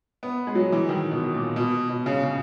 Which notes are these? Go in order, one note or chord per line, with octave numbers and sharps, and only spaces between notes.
B3
G#3
F#3
E3
D#3
B2
A#2
B2
B2
C#3
C#3